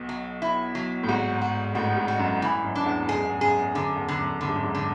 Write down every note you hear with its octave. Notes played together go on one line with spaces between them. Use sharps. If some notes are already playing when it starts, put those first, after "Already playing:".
Already playing: B1 B2
F#3
E4
F#3
A2
G#1 G#2 F#4
F#4
A1 A2 F#4
G#1 G#2
F#4
F#2
E3
F#2
D4
E2
F#2 G#4
E2
F#2 G#4
E2
F#2 D3
E2
D3
F#2
F#2 D3
G#2
F#2
G#1 G#2
D3